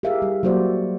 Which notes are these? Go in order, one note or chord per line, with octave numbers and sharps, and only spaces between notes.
G4 G#4 A#4 E5 F5
G3 G4
F#3 A#3 F#4 C5 D5